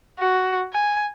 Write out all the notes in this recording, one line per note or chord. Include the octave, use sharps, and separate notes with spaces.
F#4
G#5